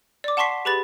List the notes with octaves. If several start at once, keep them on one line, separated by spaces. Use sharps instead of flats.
D5 D6
F#5 A5 C6 C#6 B6 C7
G4 G#4 B4 B5 A6